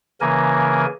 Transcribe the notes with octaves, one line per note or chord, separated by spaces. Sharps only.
C#3 E3 A#3 A#4 G#5